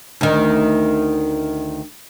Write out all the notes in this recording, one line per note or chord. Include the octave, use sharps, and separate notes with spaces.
D2 D#3